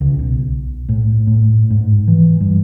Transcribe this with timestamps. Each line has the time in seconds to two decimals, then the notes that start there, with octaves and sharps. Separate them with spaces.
0.01 C#2
0.19 B1
0.89 A2
1.27 A2
1.70 G#2
2.08 E3
2.40 G2